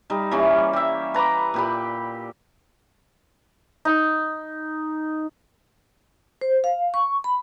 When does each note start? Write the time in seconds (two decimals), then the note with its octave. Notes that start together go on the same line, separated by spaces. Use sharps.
0.10 G3 D#4
0.31 E3 G3 A#3 C#4
0.73 G4 E5
1.14 B4 A#5 B5 D6
1.54 A#2 G4 B5
3.85 D#4
6.41 C5
6.64 F5
6.94 C#6
7.24 B5